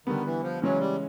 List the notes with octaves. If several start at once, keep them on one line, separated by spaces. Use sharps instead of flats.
D3 D#3 G3 B3
E3
F3
C#3 E3 F#3 G#3 C#4
G3